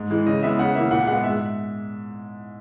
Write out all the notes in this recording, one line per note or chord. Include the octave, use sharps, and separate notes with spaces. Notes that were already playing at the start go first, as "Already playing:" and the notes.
Already playing: G#2
E3 G#3
C#3 D#5
E3 G#3 B3 E5
C#3 F#5
E3 A#3 E5
A#2 F#5
G#3 B3 F#5
G#2 E5